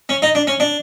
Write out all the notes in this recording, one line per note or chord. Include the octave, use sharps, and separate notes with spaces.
C#4
D#4
D4
C#4
D4